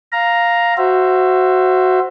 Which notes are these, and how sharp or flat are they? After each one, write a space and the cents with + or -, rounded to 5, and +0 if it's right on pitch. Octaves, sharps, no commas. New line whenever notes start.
F5 +0 A#5 +0
F#4 +0 C5 +0 E5 +20